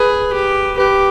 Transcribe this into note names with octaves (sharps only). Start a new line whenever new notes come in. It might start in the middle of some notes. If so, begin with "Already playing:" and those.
Already playing: G#4 B4
G4
G4 B4